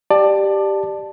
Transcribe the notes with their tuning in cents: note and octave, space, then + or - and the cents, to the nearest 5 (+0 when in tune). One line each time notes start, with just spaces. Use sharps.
G4 +0 D5 +20 A5 +0